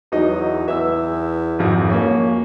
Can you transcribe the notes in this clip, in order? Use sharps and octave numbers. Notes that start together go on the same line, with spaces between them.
E2 F#3 D#4 D#5
E2 E5 E6
G#1 F2
A#3 C#4